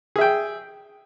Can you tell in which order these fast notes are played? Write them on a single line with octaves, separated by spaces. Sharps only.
G#4 E5 G5